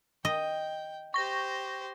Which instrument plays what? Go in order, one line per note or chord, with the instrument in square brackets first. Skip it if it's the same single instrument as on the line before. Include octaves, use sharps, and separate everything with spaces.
[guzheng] D#5 [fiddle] G5
[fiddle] G4 C5 [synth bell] C#6 A#6